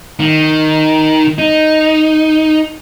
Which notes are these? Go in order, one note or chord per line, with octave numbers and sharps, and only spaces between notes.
D#3
D#4